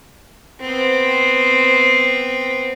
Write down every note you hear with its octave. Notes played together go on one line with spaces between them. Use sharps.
B3 C4